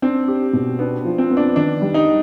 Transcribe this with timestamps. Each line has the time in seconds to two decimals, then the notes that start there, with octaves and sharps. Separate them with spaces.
0.02 C4 D4
0.28 G4
0.53 B2
0.79 B3 D4
1.05 F3
1.18 C4
1.31 B3
1.37 D4
1.56 D#3 D4
1.82 G3
1.94 D#4